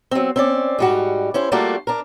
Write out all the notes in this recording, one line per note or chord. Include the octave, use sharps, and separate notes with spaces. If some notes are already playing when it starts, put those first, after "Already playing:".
F#3 C4
C4 C#4 D5
G#2 G3 F#4
C#4 E4 C5
G3 A3 A#3 D4 F4 F#4
D4 A#4